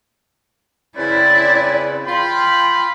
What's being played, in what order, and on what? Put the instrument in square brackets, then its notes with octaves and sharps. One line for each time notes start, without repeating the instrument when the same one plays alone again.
[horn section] C#3 C4 B4 [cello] E4 D5
[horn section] F4 B5 [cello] G5